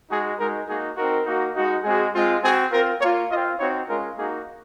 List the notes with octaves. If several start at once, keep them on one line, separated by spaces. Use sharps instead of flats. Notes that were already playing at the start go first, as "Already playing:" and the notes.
G#3 D#4 F#4 G#4
G#3 D#4 F#4 A#4
A#3 D#4 F#4 G#4
C4 D#4 F#4 A#4
A#3 D#4 F#4
G#3 D#4 F#4
G#3 C4 F#4 G#4
G#3 C4 F4
C4 F#4 G#4
C4 F4 A#4
A#3 F4 C#5
C4 F4 D#5
C4 D#4 F#4 C#5
G#3 C#4 F4 A#4
A#3 D#4 F#4 G#4